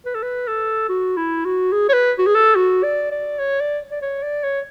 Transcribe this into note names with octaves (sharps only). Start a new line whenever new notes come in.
B4
A4
B4
A4
F#4
E4
F#4
G#4
C#5
B4
F#4
G#4
A4
F#4
D5
D5
C#5
D5
D5
C#5
D5
C#5